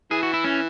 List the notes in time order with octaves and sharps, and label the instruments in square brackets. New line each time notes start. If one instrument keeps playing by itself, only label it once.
[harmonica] E3 [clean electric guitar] G#4
[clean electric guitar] F#4
E4
C#4